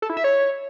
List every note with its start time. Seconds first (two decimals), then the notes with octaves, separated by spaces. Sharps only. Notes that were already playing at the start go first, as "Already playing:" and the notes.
0.02 A4
0.10 E4
0.17 E5
0.24 C#5